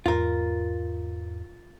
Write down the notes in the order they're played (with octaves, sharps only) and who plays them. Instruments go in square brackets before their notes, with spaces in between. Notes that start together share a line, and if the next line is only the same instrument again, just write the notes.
[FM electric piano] E2 G#2 [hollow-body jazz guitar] F4 A#4